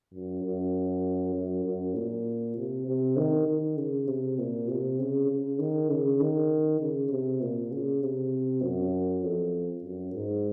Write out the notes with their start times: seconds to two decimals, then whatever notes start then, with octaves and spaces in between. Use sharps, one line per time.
0.14 F#2
0.43 F#2
1.35 F#2
1.65 F#2
1.95 A#2
2.57 C3
2.87 C3
3.17 D#3
3.47 D#3
3.77 C#3
4.07 C3
4.39 A#2
4.69 C3
4.99 C#3
5.29 C#3
5.59 D#3
5.90 C#3
6.21 D#3
6.81 C#3
7.11 C3
7.42 A#2
7.72 C#3
8.02 C3
8.62 F#2
9.23 F2
9.84 F#2
10.14 G#2